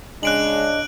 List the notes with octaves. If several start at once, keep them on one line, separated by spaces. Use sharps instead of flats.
C#3 G#3 D4 D#5 F#6 D7 F#7